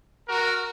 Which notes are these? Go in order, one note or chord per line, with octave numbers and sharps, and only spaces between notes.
F#4 A#4